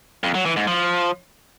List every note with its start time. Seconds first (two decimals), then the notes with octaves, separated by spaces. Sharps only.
0.24 F2
0.35 F#3
0.45 E3
0.56 G#2
0.67 F3